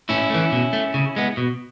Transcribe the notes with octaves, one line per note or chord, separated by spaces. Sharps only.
A2 C#4 E4
E3 A3
B2
A3
C#3
G#3 B3
B2